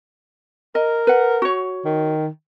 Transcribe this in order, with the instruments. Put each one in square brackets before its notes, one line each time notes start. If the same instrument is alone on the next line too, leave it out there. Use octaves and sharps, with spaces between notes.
[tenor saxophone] A#4 [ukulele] D#5
[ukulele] B4 F#5
F#4 C#5
[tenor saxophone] D#3